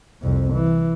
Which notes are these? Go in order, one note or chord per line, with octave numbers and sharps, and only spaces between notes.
C2 F2
E3